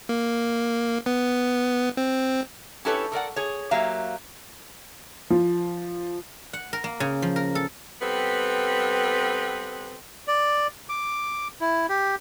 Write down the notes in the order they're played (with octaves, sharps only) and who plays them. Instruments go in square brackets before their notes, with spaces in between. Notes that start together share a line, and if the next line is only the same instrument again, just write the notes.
[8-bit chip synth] A#3
B3
C4
[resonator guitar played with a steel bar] C#4 E4 G4 A4 B4 C#5
A4 A#4 D5 F#5
G#4 C#5
F#3 A#3 G4 E5 F5
[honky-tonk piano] F3
[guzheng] F#5
A#4
A#3
C#3
F3
A#4
A4
[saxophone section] G3 B3 C4 A4 B4
[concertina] D5
D6
E4
G4